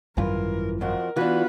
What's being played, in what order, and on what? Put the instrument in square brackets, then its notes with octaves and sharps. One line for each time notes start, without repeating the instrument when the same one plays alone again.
[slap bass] G#1 F#2 G3 [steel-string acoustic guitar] E3 F4 [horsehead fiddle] A#4
[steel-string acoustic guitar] F2 F3 F#4 [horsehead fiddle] A#4
[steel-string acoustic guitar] E3 D4 [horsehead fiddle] B3 B4 [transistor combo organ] F4 F#4